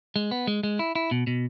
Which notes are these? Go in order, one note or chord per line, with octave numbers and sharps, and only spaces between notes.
G#3
B3
G#3
G#3
E4
E4
B2
B2